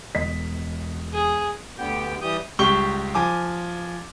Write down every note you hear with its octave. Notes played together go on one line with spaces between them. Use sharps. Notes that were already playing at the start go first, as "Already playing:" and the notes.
E1 D#5 B6
G#4
D2 D3 B3 G4 G5
E3 G3 G4 D#6 G6
C#2 G3 G4 C#6 G7
F3 G#5 D6